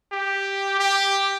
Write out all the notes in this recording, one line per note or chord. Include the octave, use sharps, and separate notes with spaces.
G4
G4